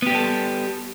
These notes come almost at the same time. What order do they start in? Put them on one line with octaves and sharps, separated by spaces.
B3 G4 G3 A4